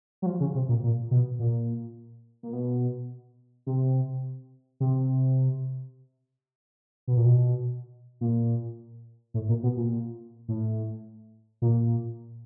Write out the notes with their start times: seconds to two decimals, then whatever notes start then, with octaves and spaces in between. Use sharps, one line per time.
0.22 F#3
0.26 F3
0.40 C#3
0.55 C3
0.69 A#2
0.83 A#2
1.11 B2
1.39 A#2
2.43 A#2
2.53 B2
3.67 C3
4.80 C3
7.07 B2
7.17 A#2
7.25 B2
8.21 A#2
9.34 A2
9.49 A#2
9.63 B2
9.77 A#2
10.48 A2
11.62 A#2